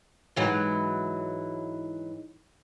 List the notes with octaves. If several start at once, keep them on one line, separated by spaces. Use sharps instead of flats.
G#2 E3 F#3